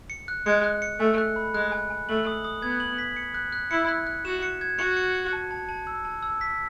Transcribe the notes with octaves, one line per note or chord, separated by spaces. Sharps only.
C#7
F#6
G#3 C#7
F#6
C#7
A3 G#5
F#6
B5
G#3 F#6
G#5
G#5
A3 F#7
D#6
D#6
B3 G#6
F#7
B6
C#7
F#6
F#6
E4 C#7
F#6
F#6
F#4 E7
C#7
G#6
F#4 C#7
C#7
C#7
A5
A5
A5
E6
A5
E6
B6